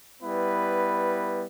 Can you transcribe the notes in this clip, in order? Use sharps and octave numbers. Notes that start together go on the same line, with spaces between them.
G3 B3 E4 B4